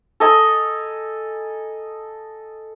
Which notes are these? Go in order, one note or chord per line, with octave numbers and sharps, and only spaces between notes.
A4 D#5 G#5 A#5